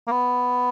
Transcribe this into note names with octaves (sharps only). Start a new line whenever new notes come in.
A#3
B3